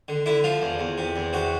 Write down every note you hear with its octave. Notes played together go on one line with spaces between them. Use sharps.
D3
D3 E4
F3 F4
E2
E2
C3
E2
C3 F#4